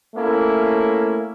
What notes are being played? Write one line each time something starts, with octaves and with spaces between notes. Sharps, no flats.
A3 A#3 C#4 E4